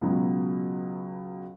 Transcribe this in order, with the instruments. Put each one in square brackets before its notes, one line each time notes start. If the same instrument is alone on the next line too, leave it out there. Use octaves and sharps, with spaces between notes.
[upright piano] C#2 B2 F#3